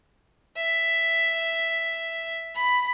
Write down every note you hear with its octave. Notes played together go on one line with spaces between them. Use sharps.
E5
B5